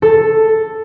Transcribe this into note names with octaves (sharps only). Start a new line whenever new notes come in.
A4